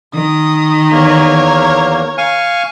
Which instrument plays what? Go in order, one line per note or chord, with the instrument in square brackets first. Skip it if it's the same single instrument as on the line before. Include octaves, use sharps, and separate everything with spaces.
[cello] D#3 [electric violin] D#6
[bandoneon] E2 A#3 [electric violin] A#4 C#5
[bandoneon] F5 G#5 C#6